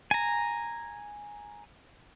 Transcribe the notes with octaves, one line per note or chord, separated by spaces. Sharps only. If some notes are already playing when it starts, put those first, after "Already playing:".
G#5 A#5